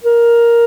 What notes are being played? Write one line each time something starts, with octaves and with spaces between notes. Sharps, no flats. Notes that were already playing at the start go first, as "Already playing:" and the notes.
A#4